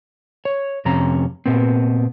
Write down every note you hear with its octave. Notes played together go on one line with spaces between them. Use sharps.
C#5
F2 C3 C#4 A#5
A#2 B3 C4